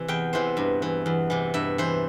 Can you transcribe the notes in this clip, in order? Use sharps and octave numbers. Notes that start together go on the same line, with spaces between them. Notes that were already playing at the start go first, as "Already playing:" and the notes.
Already playing: C3 E3
E2 G5
C3 E3 C5
G2
E3
E2
C3 E3
G2 E5
E3 C5